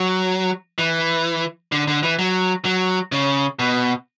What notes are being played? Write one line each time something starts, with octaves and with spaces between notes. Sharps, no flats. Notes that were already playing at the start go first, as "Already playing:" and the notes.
Already playing: F#3
E3
D3
D3
E3
F#3
F#3
C#3
B2